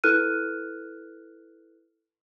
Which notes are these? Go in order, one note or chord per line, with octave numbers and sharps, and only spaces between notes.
E4 A4 B4 F6 F#6 D#7